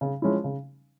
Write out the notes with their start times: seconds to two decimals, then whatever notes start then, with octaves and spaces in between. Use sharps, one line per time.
0.01 C#3
0.22 F3 G#3 C#4 E4
0.44 C#3